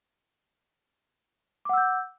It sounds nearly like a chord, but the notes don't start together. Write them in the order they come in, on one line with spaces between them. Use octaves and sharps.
D6 F#5 E6 G6